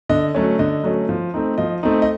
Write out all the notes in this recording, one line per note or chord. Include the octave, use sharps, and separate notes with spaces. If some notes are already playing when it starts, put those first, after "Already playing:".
D3 D#5
F#3 A3 C#4
D3 D#5
F#3 A3 C#4
F3
A3 C4 D#4
F3 D#5
A3 C4 D#4
D#5